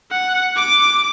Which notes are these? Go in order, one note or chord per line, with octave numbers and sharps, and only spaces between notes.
F#5
D6